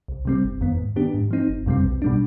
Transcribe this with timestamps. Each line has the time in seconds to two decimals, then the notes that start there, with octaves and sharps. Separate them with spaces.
0.08 C2
0.25 C3 G3 C4
0.44 G1
0.61 F2 D#3 B3
0.79 G#2
0.96 D#3 B3 D4 G4
1.14 G#2
1.31 F3 C4 D#4
1.49 G1
1.66 F2 C3 G3 C4
1.84 B1
2.02 B2 G3 D4